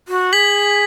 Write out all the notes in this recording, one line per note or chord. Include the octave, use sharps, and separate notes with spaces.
F#4
G#4 G#6 B6 F#7